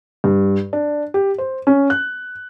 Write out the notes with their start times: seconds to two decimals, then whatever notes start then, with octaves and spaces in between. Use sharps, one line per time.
0.24 G2
0.73 D4
1.14 G4
1.38 C5
1.67 C#4
1.90 F#6